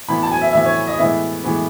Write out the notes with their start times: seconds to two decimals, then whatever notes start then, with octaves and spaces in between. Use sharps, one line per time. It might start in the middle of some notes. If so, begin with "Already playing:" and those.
0.08 A2 E3 B3 B5
0.23 A5
0.32 G#5
0.42 E5
0.53 A2 E3 B3 E5
0.65 C#5
0.87 D#5
0.98 A2 E3 G#3 B3 E5
1.43 A2 E3 G#3 B3